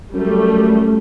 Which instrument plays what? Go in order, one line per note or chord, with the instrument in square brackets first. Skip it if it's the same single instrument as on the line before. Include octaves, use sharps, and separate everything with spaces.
[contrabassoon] F#2 [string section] G3 A3